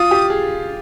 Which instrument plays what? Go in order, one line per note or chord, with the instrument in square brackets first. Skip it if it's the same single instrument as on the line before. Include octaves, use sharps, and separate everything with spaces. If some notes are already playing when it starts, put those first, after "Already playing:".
Already playing: [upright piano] F4 [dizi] D#6
[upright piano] G4
G#4